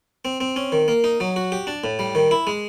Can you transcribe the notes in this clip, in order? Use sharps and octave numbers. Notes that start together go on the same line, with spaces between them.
C4
C4
C#4
D#3
A#3
D#4
F#3
F#4
G4
D4
A2
G3
D#3
E4
G#3